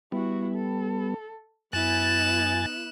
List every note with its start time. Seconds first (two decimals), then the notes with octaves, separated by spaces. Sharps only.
0.12 G3 B3 E4 F#4
0.55 A4
1.73 F#2 B3 E4 G#5 F#6 A6 E7